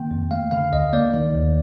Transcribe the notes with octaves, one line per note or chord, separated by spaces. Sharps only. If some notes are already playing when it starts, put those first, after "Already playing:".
Already playing: D#3 A#3 G5
F2
A3 F5
D3 F5
D2 D#5
A#3 D5
D#3
D#2